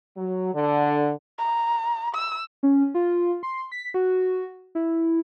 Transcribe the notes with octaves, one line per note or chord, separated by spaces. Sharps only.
F#3
D3
A#5
E6
C#4
F4
C6
B6
F#4
E4